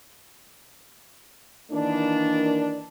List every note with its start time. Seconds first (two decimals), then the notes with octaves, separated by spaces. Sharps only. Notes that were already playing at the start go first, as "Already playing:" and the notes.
1.72 D#3 E3 A#3 D4